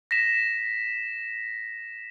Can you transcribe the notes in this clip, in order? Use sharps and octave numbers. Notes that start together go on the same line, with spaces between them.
A#6 B6 E7